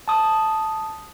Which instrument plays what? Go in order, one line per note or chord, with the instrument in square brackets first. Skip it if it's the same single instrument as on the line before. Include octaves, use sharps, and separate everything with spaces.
[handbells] A5 D#6